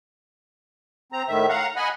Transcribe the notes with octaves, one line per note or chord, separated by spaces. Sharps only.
C4 A#5
A2 D#3 E5
F5 F#5 A#5
D#5 F#5 G#5 B5